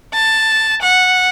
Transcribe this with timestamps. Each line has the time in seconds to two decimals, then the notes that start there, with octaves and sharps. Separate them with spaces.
0.13 A5
0.81 F#5